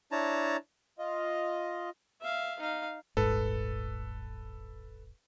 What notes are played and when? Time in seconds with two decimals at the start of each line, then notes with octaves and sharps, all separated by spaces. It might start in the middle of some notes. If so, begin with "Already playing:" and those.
0.12 D4 E4 C#5 A5 A#5
0.99 F4 D#5
2.21 E5 F5
2.60 D#4 F5
3.17 D#1 G#1 G#2 A4 B4